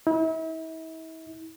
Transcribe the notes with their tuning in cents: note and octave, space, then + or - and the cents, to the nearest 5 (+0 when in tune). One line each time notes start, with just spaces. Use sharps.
E4 -40